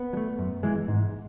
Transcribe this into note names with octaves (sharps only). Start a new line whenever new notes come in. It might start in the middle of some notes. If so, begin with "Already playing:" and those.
Already playing: B3
F#3
A3
F#2
E3 G#3
G#2